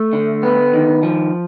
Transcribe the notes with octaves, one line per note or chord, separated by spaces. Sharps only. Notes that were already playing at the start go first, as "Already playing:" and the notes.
Already playing: A3
D3
B3
D#3
F3